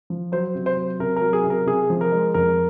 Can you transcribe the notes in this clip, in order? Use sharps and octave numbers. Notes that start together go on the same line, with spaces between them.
F3
F#3 C5
C3
C5
F#3
C3 A#4
A#4
F#3
G#4
C3
A#4
C3 G#4
F3
A#4
G#3
F2 A#4